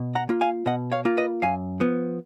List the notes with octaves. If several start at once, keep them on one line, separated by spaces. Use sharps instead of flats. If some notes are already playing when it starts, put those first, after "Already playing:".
Already playing: B2
F#5 A#5
A#3 F4
F5 G#5
B2 D#5 F#5
C#5 F5
A#3 F4
B4 D#5
F#2 F5 G#5
F3 B3